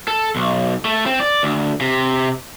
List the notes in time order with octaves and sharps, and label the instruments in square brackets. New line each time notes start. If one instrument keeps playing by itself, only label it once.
[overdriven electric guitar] A4
B1
A3
C4
D5
D2
C3